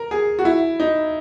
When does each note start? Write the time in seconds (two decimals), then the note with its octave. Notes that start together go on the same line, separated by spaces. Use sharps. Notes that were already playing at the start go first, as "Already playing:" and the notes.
Already playing: A#4
0.11 G#4
0.39 F#4
0.45 E4
0.80 D#4